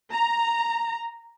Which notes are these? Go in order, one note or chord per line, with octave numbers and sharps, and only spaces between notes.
A#5